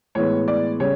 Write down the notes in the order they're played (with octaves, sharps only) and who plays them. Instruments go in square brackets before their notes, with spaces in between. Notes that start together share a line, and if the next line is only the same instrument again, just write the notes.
[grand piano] A2 E3 G#3 B3 C#5
D5
C#3 G3 C#5